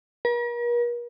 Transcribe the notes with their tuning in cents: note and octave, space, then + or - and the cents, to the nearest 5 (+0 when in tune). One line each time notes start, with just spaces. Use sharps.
A#4 +45